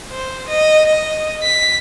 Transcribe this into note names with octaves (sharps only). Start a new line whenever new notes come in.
C5
D#5
D#5
B6